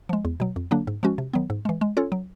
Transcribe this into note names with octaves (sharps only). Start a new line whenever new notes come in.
F3 G#3
E2
B2 F#3
F2
D3 F#3 A#3 D4
G#2
F3 G#3 C#4 F#4
C3
D#3 F#3 B3
G#2
E3 G#3
G#3
C#4 F4 A4 C#5
F#3